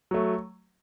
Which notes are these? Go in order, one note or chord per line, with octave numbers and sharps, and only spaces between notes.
F#3 A3